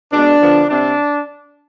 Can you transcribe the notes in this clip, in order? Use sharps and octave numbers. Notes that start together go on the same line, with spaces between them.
B2 G#3 B3 D4
D3 F3 B3
C3 G3 C4 D4